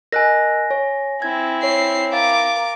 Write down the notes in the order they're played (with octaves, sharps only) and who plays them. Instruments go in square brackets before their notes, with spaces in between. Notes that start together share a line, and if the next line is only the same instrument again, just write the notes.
[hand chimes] A#4 D#5 F#6 [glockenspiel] G#5 A#6
[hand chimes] C#5
[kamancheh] C4 E4 [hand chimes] G#6
[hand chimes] C#5 [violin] C7
[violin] A#4 D6 [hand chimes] F5 A6